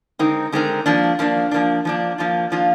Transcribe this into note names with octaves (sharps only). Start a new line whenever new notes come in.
D3 G#3 C4 D#4 A#4
D3 G#3 C4 D#4 A#4
F3 A#3 D4
F3 A#3 D4
F3 A#3 D4
F3 A#3 D4
F3 A#3 D4 F4
F3 A#3 D4 F4